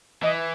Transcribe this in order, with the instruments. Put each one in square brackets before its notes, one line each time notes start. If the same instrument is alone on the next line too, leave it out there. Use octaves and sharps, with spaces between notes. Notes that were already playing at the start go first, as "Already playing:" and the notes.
[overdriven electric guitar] E3 [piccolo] D#5